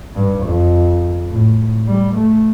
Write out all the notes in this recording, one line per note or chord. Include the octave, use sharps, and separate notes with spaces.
G2
F2
A2
G3
A3